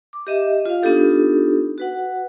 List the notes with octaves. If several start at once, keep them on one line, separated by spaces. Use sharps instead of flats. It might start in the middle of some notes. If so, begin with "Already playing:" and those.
D6
G4 D#5 E5
F4 F5
B3 D4 D#4 F4 G4 A4
F#4 B4 F#5